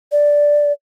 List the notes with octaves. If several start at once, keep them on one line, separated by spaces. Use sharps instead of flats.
D5